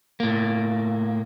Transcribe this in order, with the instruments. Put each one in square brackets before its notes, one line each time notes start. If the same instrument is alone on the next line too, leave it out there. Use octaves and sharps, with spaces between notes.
[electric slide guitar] A2 A#3